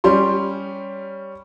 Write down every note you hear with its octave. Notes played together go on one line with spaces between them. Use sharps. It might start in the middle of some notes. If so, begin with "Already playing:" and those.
G3 C#4 G4 C6